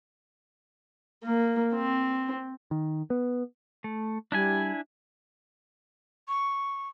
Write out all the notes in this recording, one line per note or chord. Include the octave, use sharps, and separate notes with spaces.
A#3
C4
D#3
B3
A3
G3 D4 E4 G#5
C#6